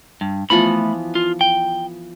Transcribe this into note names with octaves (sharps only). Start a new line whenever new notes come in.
G2
E3 F3 A3 B3 B5
F4
G5